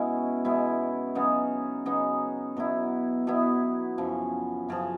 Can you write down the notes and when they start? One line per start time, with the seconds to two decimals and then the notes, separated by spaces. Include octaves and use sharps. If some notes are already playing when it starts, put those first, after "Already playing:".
Already playing: B2 G#3 C#4 E4
0.45 B2 G#3 C#4 E4
1.15 C#3 F#3 B3 D#4
1.86 C#3 F#3 B3 D#4
2.57 B2 F#3 B3 E4
3.27 B2 F#3 B3 E4
3.98 F#2 C#3 F3
4.68 F#2 C#3 F3